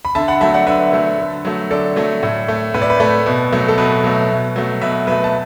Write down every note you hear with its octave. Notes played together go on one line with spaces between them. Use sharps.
B5
D3 E5 A5
F#5 B5
F#3 A3 E5 A5
D5 F#5
D3 B4 E5
F#3 A3
D3
F#3 A3
D3 A4 D5
F#3 A3
A2
A3
A2 B4
D5
B4
A3
B2
F#3 A3
A4
B2 B4
F#3 A3
B2
F#3 A3
B2 B4 E5
F#3 A3 B4 E5
A5